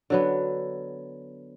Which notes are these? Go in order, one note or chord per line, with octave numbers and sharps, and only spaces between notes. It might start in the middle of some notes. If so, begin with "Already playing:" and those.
D3 F#3 B3